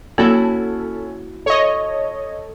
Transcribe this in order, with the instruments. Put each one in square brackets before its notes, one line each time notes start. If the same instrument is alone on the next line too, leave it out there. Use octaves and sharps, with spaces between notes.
[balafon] A#3 [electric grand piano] C#4 [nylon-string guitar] E4 F#4 [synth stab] A4
[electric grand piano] A4 [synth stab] C#5 D#5